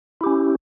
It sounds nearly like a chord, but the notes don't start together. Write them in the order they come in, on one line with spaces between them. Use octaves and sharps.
E4 G4 C#4